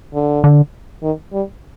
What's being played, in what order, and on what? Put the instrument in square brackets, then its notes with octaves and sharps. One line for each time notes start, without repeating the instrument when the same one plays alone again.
[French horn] D3
[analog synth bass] D3
[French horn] D#3
G3